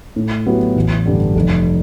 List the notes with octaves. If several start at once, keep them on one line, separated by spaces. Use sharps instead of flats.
A2
F#3 B3 E4 G4
A1
G2 D3 G3
F1